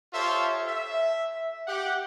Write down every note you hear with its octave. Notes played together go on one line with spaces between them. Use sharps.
F4 G4 A4 C5 C#5 E5
E5
G4 F#5